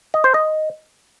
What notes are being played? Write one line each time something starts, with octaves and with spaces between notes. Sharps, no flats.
D#5
C5
D#5